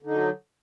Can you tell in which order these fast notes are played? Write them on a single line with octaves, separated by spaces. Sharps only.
D3 D#4 F#3